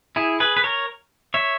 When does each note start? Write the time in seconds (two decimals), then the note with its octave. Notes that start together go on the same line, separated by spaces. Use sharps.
0.16 E4 G#4
0.40 G#4 B4
0.57 B4
0.64 A#4 C#5
1.34 C#5 E5